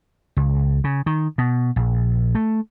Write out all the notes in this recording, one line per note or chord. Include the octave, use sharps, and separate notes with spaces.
C#2
C#3
D#3
B2
A#1
A3